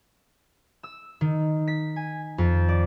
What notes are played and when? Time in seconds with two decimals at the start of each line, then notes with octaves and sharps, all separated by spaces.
0.83 E6
1.21 D#3
1.68 B6
1.96 G#5
2.38 F2
2.69 D5